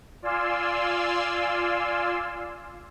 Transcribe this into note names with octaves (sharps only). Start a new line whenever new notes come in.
F4 D5 F5 G#5 C6 E6